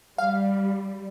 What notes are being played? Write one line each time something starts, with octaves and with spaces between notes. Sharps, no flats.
G3 F5